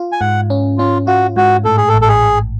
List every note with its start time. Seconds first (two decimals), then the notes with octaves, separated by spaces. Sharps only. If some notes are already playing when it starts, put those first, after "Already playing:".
Already playing: F4
0.12 G#5
0.21 G#2 F#5
0.50 C#4
0.78 C#4 F4
1.07 F4 F#4
1.36 G#2 F#4
1.65 A2 A4
1.77 G#4
1.88 A4
1.94 A1
2.02 A4
2.08 G#4
2.23 A1